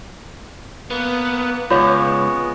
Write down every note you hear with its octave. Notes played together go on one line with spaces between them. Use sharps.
A#3 B3 B4
C#2 G#3 B3 F4 C#5 F5 C#6